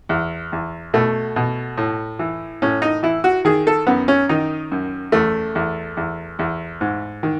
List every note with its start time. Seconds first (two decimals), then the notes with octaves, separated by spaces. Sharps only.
0.09 E2
0.52 E2
0.94 B2 A3
1.36 B2
1.77 A2
2.19 E3
2.62 A2 C#4
2.82 D#4
3.03 E3 E4
3.24 F#4
3.45 D#3 G#4
3.67 A4
3.87 F#2 B3
4.08 C#4
4.29 D#3 D#4
4.72 F#2
5.12 E2 A3
5.55 E2
5.97 E2
6.39 E2
6.81 G#2
7.23 D#3